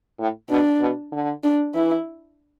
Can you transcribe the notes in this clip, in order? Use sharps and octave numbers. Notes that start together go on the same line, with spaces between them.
A2
B2 D4
B2
D3
D4
E3 E4